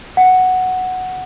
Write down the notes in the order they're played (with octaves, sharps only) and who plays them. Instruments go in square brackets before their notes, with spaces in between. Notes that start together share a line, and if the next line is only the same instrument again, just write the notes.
[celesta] F#5